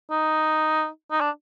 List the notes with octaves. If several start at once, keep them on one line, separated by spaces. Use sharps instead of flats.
D#4
D#4
D4